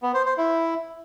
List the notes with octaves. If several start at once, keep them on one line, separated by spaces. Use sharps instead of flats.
B3
C5
C5
E4